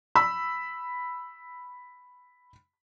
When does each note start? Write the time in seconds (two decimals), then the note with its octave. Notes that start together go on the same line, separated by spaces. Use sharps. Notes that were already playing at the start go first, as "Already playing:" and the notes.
0.16 B5 E6